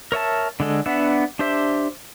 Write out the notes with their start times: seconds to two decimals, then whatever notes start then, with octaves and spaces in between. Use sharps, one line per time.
0.12 A#4 C#5 E5 A5
0.60 D3 G#3 A4
0.86 B3 D4 E5 F#5
1.39 D4 G4 C5 E5